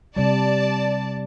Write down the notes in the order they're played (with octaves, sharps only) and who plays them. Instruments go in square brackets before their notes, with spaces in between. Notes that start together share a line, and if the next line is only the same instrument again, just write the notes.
[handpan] C3 G3 [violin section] D5 A5